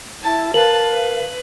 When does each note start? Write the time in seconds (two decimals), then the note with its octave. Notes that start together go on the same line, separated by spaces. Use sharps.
0.22 E4 A5
0.54 A#4 B4 F5 A5 F#7
0.90 B4